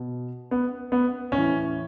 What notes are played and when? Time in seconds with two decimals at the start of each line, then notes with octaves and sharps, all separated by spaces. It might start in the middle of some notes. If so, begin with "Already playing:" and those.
Already playing: B2
0.51 B3
0.92 B3
1.32 A2 E3 C#4